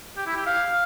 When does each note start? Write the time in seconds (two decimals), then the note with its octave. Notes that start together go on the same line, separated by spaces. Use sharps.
0.17 G4
0.27 E4
0.36 G4
0.46 F5